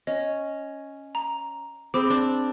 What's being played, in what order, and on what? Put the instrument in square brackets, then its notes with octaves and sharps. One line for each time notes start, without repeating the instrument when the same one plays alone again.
[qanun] C#4 [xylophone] D#5
[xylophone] A#5
[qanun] C4 [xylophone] G#4 B5 D6
[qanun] D4